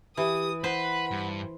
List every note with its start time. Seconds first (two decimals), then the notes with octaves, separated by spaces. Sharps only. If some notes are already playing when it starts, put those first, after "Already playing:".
0.17 E3 G4 D#6
0.64 B4 C5 F#5 B5
1.11 G2